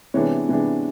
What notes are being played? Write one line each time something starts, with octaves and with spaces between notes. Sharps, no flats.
C3 E3 G#3 B3 D4 C#5
C3 E3 G#3 B3 D4